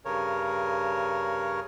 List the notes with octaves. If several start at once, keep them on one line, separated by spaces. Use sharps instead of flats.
G2 C#3 A#4 C#5